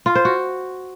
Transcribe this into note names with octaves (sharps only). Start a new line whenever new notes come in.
F4
C5
F#4